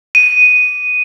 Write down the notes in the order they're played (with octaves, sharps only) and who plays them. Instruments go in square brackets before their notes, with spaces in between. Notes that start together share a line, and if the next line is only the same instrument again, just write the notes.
[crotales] D#7